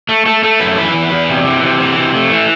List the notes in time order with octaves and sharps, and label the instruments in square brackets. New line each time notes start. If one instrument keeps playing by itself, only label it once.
[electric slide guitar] A3
A3 A4
A3 A4
F#2 B4
E3 B4
E2
E2
C3
E3
C3
E3
C3
A3
E3